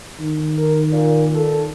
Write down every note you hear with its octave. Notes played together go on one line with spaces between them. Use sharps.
D#3
A#4
A#2
A4